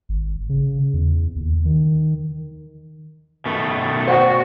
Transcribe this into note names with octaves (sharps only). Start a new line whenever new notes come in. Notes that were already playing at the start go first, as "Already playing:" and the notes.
G#1
C#3
E2
D#2
D#3
B2 D#3 A3
F#4 C5 D5 G5